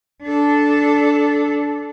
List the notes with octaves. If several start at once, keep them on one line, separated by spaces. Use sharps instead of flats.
D4 A4